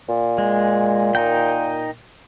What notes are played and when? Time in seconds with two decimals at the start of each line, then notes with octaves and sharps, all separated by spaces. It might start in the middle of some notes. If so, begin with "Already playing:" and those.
0.09 A#2
0.38 G#3
1.15 D#4 A#4 G5